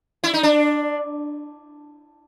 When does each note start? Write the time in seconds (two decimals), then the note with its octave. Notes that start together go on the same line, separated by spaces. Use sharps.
0.24 E4
0.34 D#4
0.43 D4